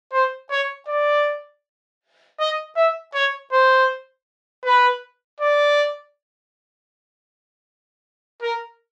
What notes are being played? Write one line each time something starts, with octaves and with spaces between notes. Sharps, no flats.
C5
C#5
D5
D#5
E5
C#5
C5
B4
D5
A#4